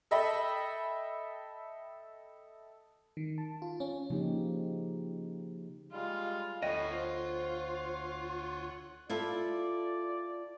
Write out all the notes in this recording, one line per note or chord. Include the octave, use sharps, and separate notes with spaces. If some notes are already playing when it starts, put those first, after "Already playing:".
A4 D#5 E5 G5 B5
D#3
A5
F4
C#4
C#3 F3 A#3 D#4 G4
G3 G#3 F4
D2 A4 C#5 D#5 F#5 G5
F4 C5
E4 F4 A4 D5